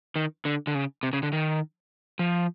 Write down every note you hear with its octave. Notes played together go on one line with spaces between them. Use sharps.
D#3
D3
D3
C#3
C3
C#3
D3
D#3
F3